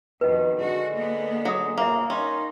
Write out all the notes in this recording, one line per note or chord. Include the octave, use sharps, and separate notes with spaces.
F2 B2 D#3 B4 D#5
D3 G#3 F#4
A#3 B3
F#3 G#4 D#6
F#2 A#2 C#3 A#3 E5 F#5
C#4 D#4 A#4 F5 C6